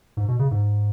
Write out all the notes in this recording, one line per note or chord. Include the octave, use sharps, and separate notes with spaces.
G#2
B2
C#3
G#2